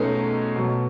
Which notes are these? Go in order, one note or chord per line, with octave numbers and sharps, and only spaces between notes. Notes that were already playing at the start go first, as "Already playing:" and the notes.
Already playing: B2 F#3 G#3 A3 B3 C#4 D#4
B2 F#3